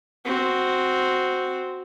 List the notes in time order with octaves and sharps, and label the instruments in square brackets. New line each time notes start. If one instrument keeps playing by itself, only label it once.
[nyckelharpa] C4 F#4